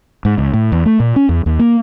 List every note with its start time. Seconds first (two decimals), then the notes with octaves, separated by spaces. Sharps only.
0.25 G#2
0.38 C#2
0.54 A2
0.72 E2
0.86 A3
1.00 A#2
1.16 C#4
1.29 E2
1.46 D#2
1.59 A#3